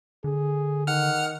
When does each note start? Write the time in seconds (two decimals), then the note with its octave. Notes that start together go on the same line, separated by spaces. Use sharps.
0.24 D3 G#4
0.87 D#3 F#5 F6